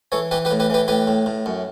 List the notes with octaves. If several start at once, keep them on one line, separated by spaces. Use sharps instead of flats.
E3 A4 C#5
E3 G4 B4
G4 B4
A2
G4 B4
E3 G4 B4
A2 G4 B4
A2
A2
F#2